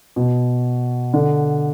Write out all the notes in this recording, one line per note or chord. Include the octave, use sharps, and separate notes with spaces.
B2
D3